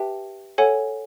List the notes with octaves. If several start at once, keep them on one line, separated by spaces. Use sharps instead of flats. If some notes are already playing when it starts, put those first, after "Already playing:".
Already playing: G4 B4 E5 G5 A5
A4 C#5 F#5 G#5